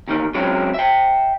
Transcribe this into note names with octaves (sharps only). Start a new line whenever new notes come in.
E2 D#3 A#3
F#3 G#3 C4 C#4
E5 G5